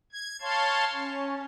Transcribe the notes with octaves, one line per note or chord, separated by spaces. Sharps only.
G#6
C#5 F5 A5 C6
C#4